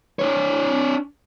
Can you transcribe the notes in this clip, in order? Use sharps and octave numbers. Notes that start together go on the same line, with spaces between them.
D4 C#5